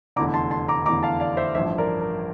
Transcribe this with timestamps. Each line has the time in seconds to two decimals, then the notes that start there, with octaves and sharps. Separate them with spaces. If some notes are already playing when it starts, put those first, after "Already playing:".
0.16 F1 E2 D3 A#5 D6
0.34 A5 C6
0.51 A5 C6
0.68 A#5 D6
0.86 F1 E2 D3 A#5 D6
1.03 F5 A5
1.20 D5 F5
1.37 C5 E5
1.55 A1 G2 F3 C5 E5
1.78 A#4 D5
2.01 A#4